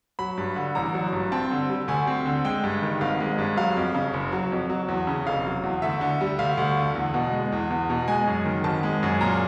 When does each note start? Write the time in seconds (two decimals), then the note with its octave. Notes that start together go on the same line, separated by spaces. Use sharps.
0.19 F#3 B5
0.38 G2
0.56 D3
0.75 A1 A#5
0.94 F#3
1.13 G2
1.32 C4 A5
1.51 D3
1.69 G3
1.88 D2 G#5
2.07 C4
2.26 D3
2.45 G#3 G5
2.64 G2
2.82 D#3
3.01 G#1 F5
3.20 G#3
3.38 G2
3.57 F#3 F5
3.77 F2
3.94 C#3
4.14 F#1
4.32 F#3
4.52 F2
4.70 F#3
4.88 E2
5.07 C#3
5.26 F1 F5
5.46 F#3
5.63 E2
5.82 D2 E5
6.01 D3
6.21 G3
6.39 D2 F5
6.58 D2
6.77 D3
6.95 E2
7.14 B2
7.32 G#3
7.52 E2
7.70 E2
7.90 B2
8.08 G#3 G#5
8.27 F#2
8.45 D#3
8.64 G#1 A5
8.83 G#3
9.03 F#2
9.21 A#2 A#5